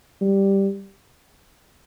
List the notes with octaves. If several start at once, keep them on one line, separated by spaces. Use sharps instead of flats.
G3